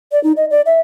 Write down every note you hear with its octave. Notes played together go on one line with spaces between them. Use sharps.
D5
D#4
D#5
D5
E5